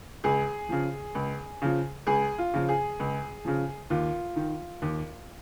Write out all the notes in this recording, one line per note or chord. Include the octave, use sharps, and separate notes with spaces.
C#2 G#4
C#3 F3
C#2
C#3 F3
C#2 G#4
F4
C#3 F3
G#4
C#2
C#3 F3
D#2 F4
D#3
D#2